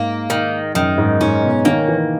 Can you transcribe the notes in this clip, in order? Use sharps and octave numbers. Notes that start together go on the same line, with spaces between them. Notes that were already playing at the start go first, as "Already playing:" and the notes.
Already playing: G#2 A#3
D#3
F#2 D#3
G#2
G#2 C#4
B2
D#3 A#3
E3